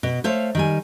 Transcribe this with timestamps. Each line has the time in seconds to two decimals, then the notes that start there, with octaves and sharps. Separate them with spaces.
0.03 B2
0.24 A3 C5 C#5 F5
0.55 D#3 G3 G#5